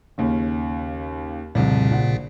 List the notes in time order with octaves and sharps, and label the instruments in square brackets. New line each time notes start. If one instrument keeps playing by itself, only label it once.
[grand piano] D#2 C#3
[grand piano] C2 F2 [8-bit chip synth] A#2 C#3
[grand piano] A#1 F#5